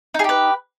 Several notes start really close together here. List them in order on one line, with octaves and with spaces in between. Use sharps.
D#4 G#4 G4 B4